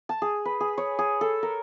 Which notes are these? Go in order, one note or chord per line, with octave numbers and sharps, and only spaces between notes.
A5
G#4
B4
G#4
C#5
G#4
A4
A#4